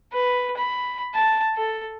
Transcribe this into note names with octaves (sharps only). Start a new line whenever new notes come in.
B4
B5
A5
A4